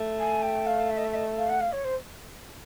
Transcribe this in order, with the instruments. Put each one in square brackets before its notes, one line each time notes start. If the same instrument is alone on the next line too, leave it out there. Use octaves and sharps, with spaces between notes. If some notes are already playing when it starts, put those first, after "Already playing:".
Already playing: [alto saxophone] A3
[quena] G#5
G5
F5
E5
D#5
E5
D#5
F5
F#5
F5
C#5
C5